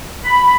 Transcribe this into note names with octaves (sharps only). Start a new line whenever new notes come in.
B5